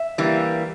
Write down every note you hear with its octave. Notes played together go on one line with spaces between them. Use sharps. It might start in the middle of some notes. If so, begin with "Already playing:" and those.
Already playing: E5
E3 G3 A#3